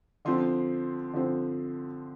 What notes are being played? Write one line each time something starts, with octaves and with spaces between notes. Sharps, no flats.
D3 F3 C4 C6
D3 F3 C4